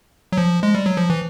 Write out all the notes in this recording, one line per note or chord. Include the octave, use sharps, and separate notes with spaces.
F#3
F3
G#3
G3
F#3
F3
E3